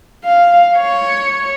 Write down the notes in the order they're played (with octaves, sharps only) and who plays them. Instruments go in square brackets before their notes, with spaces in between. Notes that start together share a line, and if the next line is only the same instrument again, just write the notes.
[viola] F5
C#5